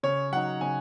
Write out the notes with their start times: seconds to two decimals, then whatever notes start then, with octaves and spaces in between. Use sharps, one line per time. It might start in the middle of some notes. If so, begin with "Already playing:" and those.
0.03 C#3 C#5
0.32 F#3 D#4 F#5
0.61 C#3 G#5